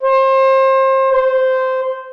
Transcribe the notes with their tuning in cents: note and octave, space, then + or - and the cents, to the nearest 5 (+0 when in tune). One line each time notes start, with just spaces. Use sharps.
C5 +30
C5 -10